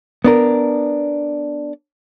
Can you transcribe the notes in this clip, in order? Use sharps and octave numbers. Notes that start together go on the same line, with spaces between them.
B3 D4 A#4